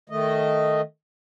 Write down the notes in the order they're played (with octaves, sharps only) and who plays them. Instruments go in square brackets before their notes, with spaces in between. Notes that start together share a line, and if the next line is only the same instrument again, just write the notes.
[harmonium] D#3 A3 D#5